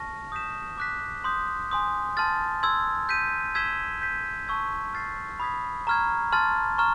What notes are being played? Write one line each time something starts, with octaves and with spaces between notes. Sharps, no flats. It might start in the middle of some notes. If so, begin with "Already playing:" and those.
Already playing: A5 C#6 F6 A#6
D#6 G6 B6 E7
D6 F#6 B6
C6 D#6 G6
G#5 C6 D#6 G6
A5 C6 F6 A6
C6 E6 G#6
G6 B6 D#7
E6 G#6 B6 E7 G7
G6 B6 D#7
A5 C#6 E6 G#6
F6 A6 C7
B5 D#6 G#6 B6
A#5 C#6 F6 G#6
A5 C6 F6 A6
A#5 C#6 F6